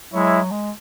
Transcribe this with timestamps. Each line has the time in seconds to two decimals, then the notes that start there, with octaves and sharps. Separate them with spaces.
0.13 F#3 G#3 E4 C#5 E5
0.51 G#3